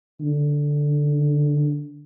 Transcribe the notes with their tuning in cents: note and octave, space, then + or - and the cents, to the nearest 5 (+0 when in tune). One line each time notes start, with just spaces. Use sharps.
D3 -5